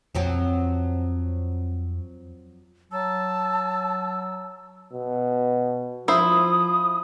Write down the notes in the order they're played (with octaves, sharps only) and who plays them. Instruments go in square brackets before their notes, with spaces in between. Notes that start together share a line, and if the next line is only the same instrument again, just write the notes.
[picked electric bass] F2 [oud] F3 F#3 C4
[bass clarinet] F#3 [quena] A5 [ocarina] E6
[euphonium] B2
[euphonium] F3 [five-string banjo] E4 C5 [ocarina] D#6